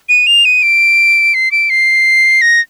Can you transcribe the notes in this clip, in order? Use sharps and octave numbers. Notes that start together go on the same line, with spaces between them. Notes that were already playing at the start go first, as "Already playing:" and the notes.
D#7
F7
D#7
D7
C7
D7
C7
A#6